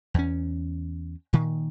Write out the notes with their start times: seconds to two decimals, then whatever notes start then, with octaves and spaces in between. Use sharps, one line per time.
0.14 E2 C#4
1.33 A#2 D#3